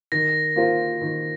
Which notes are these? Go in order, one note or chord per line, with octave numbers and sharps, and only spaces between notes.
D#3 A#6
A#3 F4 C5
D#3